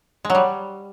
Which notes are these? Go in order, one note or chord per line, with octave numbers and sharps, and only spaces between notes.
G#3
F#3
G3